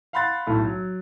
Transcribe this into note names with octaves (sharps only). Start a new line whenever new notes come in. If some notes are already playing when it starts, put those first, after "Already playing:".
F5 F#5 B5 C6 F#6 A6
B1 A2 A3
F#3